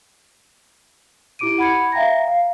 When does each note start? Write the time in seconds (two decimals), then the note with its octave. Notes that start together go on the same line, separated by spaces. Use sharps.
1.39 E4 G4 D6 D7 D#7
1.58 F#5 B5 G#6 C#7
1.92 E5 F5 G5 A#5 A#6
2.28 F5